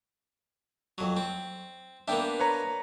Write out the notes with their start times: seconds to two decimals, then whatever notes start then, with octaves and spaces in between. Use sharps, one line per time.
0.98 F2 F#3
1.17 C4
2.08 A#3 B3 D4 E5 G5
2.40 B4 C#5 A#5